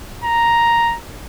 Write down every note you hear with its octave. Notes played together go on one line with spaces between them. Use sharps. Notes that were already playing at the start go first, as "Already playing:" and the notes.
A#5